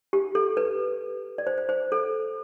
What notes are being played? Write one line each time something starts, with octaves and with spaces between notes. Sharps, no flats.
G4
A4
B4
D5
C5
C5
C5
A4